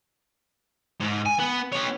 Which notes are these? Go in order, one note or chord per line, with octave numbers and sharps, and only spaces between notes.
G#2
G#5
B3
B3 C#5